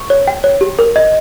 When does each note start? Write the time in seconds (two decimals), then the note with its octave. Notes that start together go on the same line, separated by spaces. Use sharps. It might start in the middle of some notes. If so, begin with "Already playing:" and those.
Already playing: C#6
0.10 C#5
0.28 G5
0.44 C#5
0.61 G4
0.79 A#4
0.96 D#5